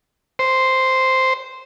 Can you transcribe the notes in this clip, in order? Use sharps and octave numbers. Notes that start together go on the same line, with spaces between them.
C5